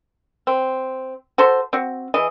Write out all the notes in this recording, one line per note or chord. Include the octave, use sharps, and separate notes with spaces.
C4
F#4 A4 C5
C4 F#4
E3 G#4 D#5